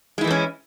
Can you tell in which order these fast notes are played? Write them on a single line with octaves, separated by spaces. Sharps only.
G#3 E4 E3 A3 C#4